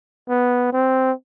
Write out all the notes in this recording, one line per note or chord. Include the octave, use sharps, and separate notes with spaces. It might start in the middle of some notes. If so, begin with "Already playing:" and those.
B3
C4